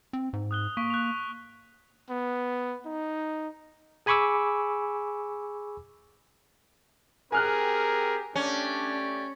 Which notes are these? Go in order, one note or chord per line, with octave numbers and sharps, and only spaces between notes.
C4
G#2
D#6 F#6 G7
A#3 C#6 B6 D7
F#6 F7
B3
D#4
G#4 G#5 B5 C#6 D6 E6
C4 G4 G#4 A#4 G#5 F6 F#6
A3 C#4 D4 G4 D5